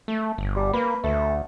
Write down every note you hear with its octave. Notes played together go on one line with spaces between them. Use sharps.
A3
G1
G3
A#3 B4
D2 A3